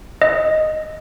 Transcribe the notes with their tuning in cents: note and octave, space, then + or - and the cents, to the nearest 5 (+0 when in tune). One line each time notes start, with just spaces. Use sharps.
D#5 +0